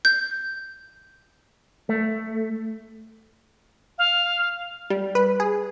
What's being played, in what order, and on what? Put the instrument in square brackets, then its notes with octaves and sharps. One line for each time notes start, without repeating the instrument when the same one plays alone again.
[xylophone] G6
[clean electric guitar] A3
[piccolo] F5
[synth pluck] G3
B4
G#4